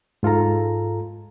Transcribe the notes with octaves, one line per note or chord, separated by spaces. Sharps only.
G#2 F4 A4 A#5